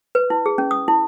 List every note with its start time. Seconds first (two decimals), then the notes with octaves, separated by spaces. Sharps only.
0.15 B4
0.30 E4
0.46 G#4
0.58 C#4
0.71 D#6
0.88 E4